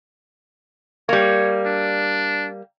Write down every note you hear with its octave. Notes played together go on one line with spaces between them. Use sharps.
G3 A#3 C#5
D4